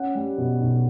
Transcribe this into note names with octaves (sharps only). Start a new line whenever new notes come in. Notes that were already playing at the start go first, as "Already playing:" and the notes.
Already playing: C#4 F#5
G3
B2
B1